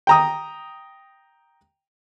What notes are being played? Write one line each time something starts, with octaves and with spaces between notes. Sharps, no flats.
G5 A#5 D#6